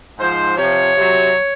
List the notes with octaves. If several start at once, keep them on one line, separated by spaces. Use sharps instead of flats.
G#2 F3 C5
C3 F3 C#5
C3 F#3